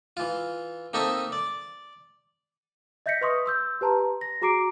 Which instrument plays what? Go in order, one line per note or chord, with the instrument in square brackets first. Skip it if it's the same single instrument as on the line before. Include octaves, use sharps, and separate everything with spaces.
[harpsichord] E3 F4
A#3 C4 D#4 A4 D#5 E5
D5
[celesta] D#5 E5 G6 A#6 B6 C#7
B4 D#5 C6 C#6 D#6
C6 E6 G6
G4 B4 A5 A#5 C6
A#6
F#4 G#4 A#5 D6 C7 D7